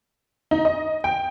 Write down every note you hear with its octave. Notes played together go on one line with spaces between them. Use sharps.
D#4
D#5
G5